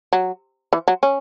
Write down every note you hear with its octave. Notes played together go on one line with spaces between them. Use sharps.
F#3
E3
F#3
C#4